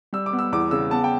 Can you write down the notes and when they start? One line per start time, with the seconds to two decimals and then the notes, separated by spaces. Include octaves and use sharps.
0.13 G3 E6
0.26 D6
0.33 B3
0.39 E6
0.52 E2 D6
0.71 C#3 E6
0.91 B3 A5
1.04 G5